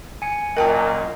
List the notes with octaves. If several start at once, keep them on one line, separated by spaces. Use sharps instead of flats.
G#5 C#7
F#2 A#2 A#4 D#5 G5 A5